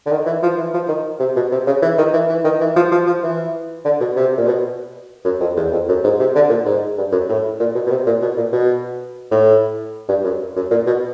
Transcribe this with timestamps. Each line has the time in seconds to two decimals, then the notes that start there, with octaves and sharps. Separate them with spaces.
0.06 D3
0.11 D#3
0.26 E3
0.43 F3
0.57 E3
0.74 F3
0.88 D#3
1.19 C3
1.36 B2
1.52 C3
1.67 C#3
1.82 E3
1.98 D#3
2.13 E3
2.29 E3
2.44 D#3
2.60 E3
2.76 F3
2.92 F3
3.07 F3
3.23 E3
3.85 D3
4.01 B2
4.16 C3
4.37 A#2
4.47 B2
5.25 F#2
5.40 F2
5.57 E2
5.72 F2
5.88 F#2
6.04 G#2
6.20 C3
6.35 D3
6.50 A#2
6.66 G#2
6.98 G2
7.12 F#2
7.29 A2
7.60 A#2
7.75 B2
7.86 B2
7.90 C3
8.07 A#2
8.21 B2
8.37 A#2
8.53 B2
9.31 A2
10.09 G2
10.24 F#2
10.56 F#2
10.71 A#2
10.87 B2